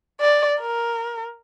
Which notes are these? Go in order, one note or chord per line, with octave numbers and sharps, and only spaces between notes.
D5
A#4